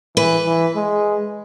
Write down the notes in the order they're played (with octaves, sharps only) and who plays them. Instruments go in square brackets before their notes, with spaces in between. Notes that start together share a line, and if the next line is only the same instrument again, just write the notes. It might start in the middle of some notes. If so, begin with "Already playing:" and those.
[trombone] E3 [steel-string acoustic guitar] B4
[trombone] E3
G#3